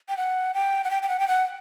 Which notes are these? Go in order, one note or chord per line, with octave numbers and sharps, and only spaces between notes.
G5
F#5
G5
F#5
G5
G5
F#5
G5
F#5